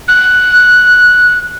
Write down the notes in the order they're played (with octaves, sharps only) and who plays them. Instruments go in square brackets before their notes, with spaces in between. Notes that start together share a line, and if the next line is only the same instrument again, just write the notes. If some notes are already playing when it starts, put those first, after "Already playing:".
[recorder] F#6